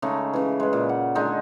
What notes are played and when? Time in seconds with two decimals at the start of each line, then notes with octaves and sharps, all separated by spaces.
0.02 C#3 G#3 A3 D#4
0.33 C#3 E3
0.60 G#3 B4
0.73 A#2
0.89 F#5
1.15 D3 G#3 D#4 G#5